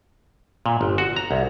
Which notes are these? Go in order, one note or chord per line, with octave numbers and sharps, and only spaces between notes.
A#2
G1
F#4
A#5
C2